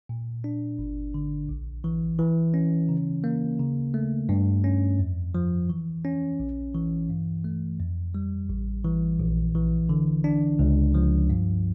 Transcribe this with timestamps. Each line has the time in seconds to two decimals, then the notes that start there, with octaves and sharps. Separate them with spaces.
0.09 A#2
0.44 D4
0.78 G1
1.14 D3
1.49 A#1
1.84 E3
2.19 E3
2.54 C#4
2.89 C#3
3.24 A#3
3.60 C#3
3.94 A3
4.29 G2
4.64 C#4
4.99 F2
5.35 F3
5.69 E3
6.05 C#4
6.40 A#1
6.75 E3
7.10 G2
7.44 A3
7.80 F2
8.15 G3
8.49 A1
8.85 E3
9.20 A#1
9.55 E3
9.89 D3
10.24 D4
10.59 C#2
10.94 F3
11.30 G2